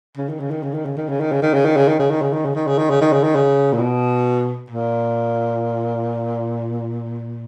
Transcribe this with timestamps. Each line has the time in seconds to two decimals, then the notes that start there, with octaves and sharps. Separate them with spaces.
0.17 C#3
0.29 D#3
0.40 C#3
0.51 D#3
0.63 C#3
0.74 D#3
0.85 C#3
0.97 D#3
1.09 C#3
1.20 D#3
1.31 C#3
1.42 D#3
1.54 C#3
1.65 D#3
1.77 C#3
1.88 D#3
1.99 C#3
2.10 D#3
2.21 C#3
2.33 D#3
2.45 C#3
2.55 D#3
2.67 C#3
2.78 D#3
2.90 C#3
3.01 D#3
3.12 C#3
3.23 D#3
3.35 C#3
3.73 A#2
3.79 B2
4.70 A#2